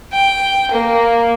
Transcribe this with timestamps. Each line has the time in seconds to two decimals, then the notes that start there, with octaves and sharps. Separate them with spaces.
0.13 G5
0.72 A#3